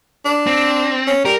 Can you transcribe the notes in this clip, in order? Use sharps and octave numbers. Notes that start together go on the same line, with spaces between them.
D4
C4
C#4
G3 A#4